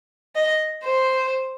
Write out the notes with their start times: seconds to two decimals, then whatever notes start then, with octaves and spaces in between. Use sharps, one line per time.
0.35 D#5
0.84 C5